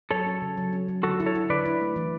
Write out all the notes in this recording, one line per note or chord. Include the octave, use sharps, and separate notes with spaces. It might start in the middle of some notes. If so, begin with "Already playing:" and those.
F#3 A4 C#5
C#4
C#3
F#3
C#4
F#3
D3 F#4 A4
E4
A4 C#5
E4
D3 B4 D5
E4
A3
E3